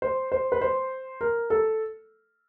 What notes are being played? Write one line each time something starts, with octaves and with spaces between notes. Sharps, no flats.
C5
C5
B4
C5
A#4
A4